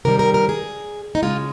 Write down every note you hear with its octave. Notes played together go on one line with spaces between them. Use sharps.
C3 D#3 G3 A#4
A#4
A#4
G#4
D#4
C#3 G#3 F4